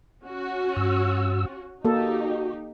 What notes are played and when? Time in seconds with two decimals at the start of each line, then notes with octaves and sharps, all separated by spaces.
0.23 C#4 F#4
0.76 G2 E6
1.85 A#3 D#4 F#4 G4 A4